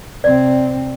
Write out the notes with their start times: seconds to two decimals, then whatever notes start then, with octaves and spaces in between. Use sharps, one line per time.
0.24 C3 C4 D5